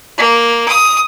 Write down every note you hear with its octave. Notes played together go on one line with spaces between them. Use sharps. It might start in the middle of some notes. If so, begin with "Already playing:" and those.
A#3
D#6